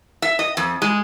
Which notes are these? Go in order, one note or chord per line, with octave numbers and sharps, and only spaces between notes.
E5
D#5
F2
G#3